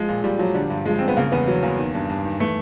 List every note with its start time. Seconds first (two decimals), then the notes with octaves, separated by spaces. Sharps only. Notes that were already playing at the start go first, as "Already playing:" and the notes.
Already playing: F3 G#3
0.09 A#2
0.24 A#2 G3
0.39 F3 F#3
0.55 D3 G3
0.70 G2
0.86 F3 G#3
0.99 G2 C4
1.08 B3
1.17 C#3 A#3
1.32 E2 B3
1.47 E3 F#3
1.63 E2 A#3
1.79 D#3
1.94 G2
2.09 G2
2.25 D#3
2.40 E3 A3